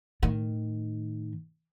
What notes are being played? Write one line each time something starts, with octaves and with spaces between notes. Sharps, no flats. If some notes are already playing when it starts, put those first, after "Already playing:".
A2 D#3